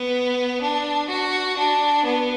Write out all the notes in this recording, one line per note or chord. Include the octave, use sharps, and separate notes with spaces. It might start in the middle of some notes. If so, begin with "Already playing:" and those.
Already playing: B3
D4
F#4
D4
B3